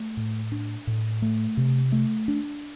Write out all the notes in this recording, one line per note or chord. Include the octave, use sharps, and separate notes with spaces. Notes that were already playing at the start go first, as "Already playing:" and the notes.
Already playing: A3
A2
D4
A2
A3
C3
A3
D4